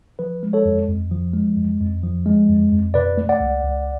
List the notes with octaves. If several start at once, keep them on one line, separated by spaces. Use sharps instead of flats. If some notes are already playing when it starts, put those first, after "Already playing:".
F3 B4
G#3
A4 C#5
F2
F2
F3
G#3
F2
F2
F3
G#3
F2
F2
B2 B4 D5
A3
D5 F#5
C#2
C#2